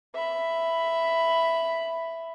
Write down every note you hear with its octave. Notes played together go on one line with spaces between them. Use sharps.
E5 B5